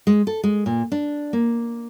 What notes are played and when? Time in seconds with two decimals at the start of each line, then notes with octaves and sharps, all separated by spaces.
0.07 G#3
0.27 A4
0.44 G#3
0.66 A#2
0.92 D4
1.33 A#3